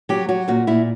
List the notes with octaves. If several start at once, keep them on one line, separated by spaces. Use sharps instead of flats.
F#3 G4
F#3 F#4
A#2 F#4
A#2 E4